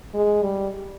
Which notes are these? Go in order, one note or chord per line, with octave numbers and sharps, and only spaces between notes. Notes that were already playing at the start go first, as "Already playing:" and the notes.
G#3
G3